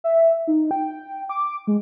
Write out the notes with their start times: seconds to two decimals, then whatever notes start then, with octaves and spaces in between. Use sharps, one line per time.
0.04 E5
0.47 D#4
0.71 G5
1.29 D6
1.67 G#3